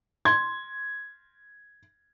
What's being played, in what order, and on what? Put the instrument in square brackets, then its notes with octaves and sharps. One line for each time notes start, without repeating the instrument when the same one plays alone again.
[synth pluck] C6 [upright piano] G#6